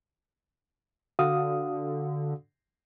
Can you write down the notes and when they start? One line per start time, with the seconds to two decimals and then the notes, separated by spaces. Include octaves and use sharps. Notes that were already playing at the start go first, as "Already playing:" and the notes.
1.19 D3 F#4 F5 D#6